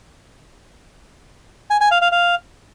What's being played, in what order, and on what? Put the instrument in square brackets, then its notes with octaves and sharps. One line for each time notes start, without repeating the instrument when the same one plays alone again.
[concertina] G#5
G#5
F5
F5
F5